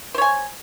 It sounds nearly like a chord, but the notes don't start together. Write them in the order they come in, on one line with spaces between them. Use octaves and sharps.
C5 C#5 G#5